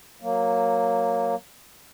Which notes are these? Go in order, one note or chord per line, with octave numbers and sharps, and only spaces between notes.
F#3 A#3